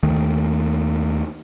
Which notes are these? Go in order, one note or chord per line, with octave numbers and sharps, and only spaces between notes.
D#2 D#3 A3